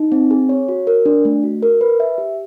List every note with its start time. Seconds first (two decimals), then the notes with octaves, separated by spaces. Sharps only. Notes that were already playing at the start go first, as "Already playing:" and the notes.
Already playing: D#4
0.12 C4
0.31 G#4
0.49 C#5
0.68 F#4
0.87 A#4
1.06 D4
1.25 A3
1.43 F#4
1.63 A#4
1.81 B4
2.00 E5
2.18 G4